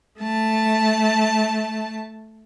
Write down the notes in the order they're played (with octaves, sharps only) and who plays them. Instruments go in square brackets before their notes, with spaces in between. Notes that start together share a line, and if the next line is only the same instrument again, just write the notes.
[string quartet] A3 A5